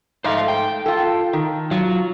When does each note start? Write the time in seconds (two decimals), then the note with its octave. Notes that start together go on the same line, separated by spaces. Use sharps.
0.24 G#2 A3 C5 F5
0.48 G5
0.86 F4 A4
1.33 D#3
1.71 F#3 F4